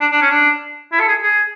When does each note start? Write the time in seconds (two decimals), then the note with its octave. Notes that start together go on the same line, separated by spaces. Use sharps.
0.01 D4
0.12 D4
0.22 C#4
0.31 D4
0.92 E4
1.00 A4
1.08 G#4
1.22 G#4